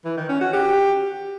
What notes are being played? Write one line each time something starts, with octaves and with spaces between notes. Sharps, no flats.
E3
D#3
C#4
F#4
G4